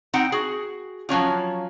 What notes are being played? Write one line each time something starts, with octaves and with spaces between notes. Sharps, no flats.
C4 D#4 F#5 G5
F#4 G#4
F3 F#3 C#4 F4